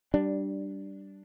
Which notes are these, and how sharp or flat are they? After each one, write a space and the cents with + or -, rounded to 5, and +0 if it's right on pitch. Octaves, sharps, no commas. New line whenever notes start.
G3 -10 D4 +0